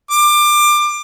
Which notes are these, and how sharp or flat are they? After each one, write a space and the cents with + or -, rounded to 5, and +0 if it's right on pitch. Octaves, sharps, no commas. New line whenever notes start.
D6 +25